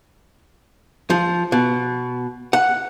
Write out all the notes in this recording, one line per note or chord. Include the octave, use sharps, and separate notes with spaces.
F3
B2
F#5